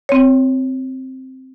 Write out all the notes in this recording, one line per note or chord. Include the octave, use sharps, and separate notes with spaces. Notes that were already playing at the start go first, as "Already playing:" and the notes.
C4 C#5